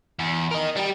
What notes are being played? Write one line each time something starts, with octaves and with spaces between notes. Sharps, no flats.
E2
A#4 D#5
G3 G4